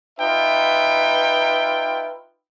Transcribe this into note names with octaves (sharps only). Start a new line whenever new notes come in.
D#4 F4 B4 E5 G5